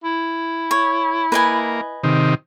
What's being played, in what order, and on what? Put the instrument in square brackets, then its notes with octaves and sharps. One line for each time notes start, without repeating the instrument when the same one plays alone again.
[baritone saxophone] E4
[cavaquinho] C#5
[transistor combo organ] A#3 [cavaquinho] B4 D#5 G#5
[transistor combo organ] C3 D#3